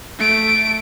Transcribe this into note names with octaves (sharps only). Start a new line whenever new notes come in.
A3 D7